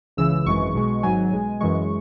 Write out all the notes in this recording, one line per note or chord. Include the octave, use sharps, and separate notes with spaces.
C#2 C#3 E3 E6
G#1 F#2 E3 G#3 C#6
B1 B2 G#3
G#1 G#2 F#3 G#5
B1 B2 G#3
F#2 E3 G#3 C#6